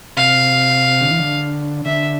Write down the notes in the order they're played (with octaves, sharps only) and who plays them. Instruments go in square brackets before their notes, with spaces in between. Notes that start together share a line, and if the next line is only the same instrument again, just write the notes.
[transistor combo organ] C3 [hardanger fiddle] F5
[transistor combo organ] D3
E3
D3
[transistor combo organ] D3 [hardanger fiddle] E5